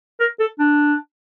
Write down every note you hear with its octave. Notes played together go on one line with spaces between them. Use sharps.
A#4
A4
D4